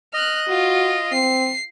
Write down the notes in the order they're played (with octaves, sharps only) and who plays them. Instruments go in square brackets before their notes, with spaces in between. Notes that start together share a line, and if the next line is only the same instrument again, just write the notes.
[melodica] D#5 [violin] F6 F#6
[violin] F4 [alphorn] F#4
[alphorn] C4 [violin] C7